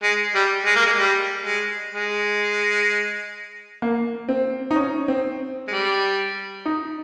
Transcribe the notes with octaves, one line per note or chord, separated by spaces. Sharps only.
G#3
G3
G#3
A#3
G#3
G3
G#3
G#3
A#3
C4
D#4
C#4
C4
G#3
G3
D#4